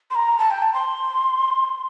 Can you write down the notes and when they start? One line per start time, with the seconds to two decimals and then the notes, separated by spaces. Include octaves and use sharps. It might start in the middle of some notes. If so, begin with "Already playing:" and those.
0.11 C6
0.15 A#5
0.39 A5
0.51 G5
0.62 A5
0.74 C6